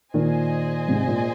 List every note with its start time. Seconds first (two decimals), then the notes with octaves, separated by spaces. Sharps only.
0.14 A#2 D#3 G#4 C5 D#5 G#5
0.88 G#2 C3
1.07 A#2